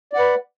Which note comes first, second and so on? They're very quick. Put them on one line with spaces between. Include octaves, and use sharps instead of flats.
D5 F#5 B4